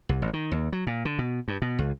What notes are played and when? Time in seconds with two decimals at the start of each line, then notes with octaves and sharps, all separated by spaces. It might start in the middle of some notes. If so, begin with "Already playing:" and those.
0.09 C2
0.22 A1
0.33 D#3
0.52 D#2
0.73 F#3
0.87 A#2
1.05 D3
1.19 B2
1.48 G2
1.62 B2
1.79 C#2